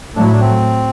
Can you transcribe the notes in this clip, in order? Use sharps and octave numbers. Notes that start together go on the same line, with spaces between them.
A2 F#3 A3 D4
E4
D4
C4